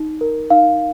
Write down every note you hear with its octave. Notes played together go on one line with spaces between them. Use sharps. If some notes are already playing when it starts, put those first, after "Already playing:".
Already playing: D#4
A#4
D#4 F5